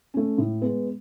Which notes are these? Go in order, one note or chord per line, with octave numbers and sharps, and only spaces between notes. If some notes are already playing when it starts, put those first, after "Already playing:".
A3 C#4
A2
G#3 B3